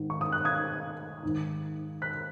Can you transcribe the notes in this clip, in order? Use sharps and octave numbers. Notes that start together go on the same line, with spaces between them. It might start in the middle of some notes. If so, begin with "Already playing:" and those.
Already playing: G#2 D#3
C#6
D#6
F#6
D#6 G#6
G#2 D#3
F#6 B6